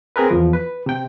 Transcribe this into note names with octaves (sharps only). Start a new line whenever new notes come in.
C4 G#4 A#4 B4
E2 F3
B4
C3 G5